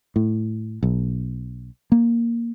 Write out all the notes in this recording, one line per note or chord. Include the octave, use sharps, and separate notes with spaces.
A2
B1
A#3